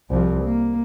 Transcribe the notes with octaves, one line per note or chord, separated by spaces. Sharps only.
C2 F3
A#3